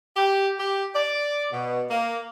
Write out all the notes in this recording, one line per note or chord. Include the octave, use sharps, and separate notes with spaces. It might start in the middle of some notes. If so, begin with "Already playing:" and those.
G4
G4
D5
B2
A#3